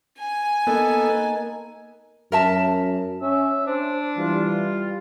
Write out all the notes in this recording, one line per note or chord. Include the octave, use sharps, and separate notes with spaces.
G#5
A#3 B3 D#4 A4 D6
F#2 A#4 E5 A5
C#4 E5
D4 C5
E3 G3 F4